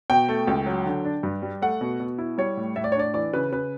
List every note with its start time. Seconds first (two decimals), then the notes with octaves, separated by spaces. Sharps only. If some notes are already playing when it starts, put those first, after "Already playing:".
0.10 B2 G5
0.29 A3
0.47 C#2
0.66 F#3
0.86 D3
1.05 D4
1.23 G2
1.42 G3
1.62 A3 F#5
1.81 B2
2.00 B2
2.18 E4
2.38 G3 C#5
2.57 A2
2.76 A2 E5
2.84 D5
2.92 C#5
2.95 D4 D5
3.14 E3 D5
3.33 C#3 B4
3.52 C#3 B4